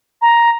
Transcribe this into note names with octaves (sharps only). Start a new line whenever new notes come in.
A#5